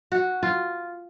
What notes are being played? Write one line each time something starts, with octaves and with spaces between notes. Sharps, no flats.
F#4
F4